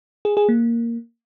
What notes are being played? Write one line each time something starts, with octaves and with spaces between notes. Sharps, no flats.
G#4
G#4
A#3